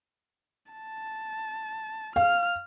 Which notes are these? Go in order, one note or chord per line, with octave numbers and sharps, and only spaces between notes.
A5
F5 F6